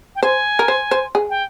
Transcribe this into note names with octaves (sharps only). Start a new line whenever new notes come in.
G5
C5 G#5
A#4
C5
C5
G#4
G5